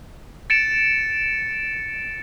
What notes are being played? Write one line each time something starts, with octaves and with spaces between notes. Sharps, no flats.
A6 C#7 D7 E7